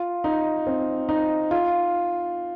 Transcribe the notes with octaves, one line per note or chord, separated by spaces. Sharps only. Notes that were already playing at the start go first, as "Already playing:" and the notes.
Already playing: F4
D#4
C4
D#4
F4